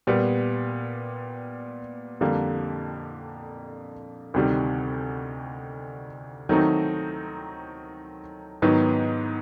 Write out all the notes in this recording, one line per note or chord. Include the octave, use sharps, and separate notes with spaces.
A#2 G3 B3
F2 D3 G3 A#3
D2 C3 D#3 G3
D#3 F#3 A3 C4 D#4
G#2 D#3 F#3 B3